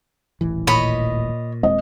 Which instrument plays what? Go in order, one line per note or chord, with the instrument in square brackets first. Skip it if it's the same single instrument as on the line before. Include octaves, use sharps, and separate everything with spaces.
[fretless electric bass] D#1 A1 E3
[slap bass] A#2 [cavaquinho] C#5 D#5 B5
[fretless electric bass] D#1 G#3 C4 [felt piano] D#5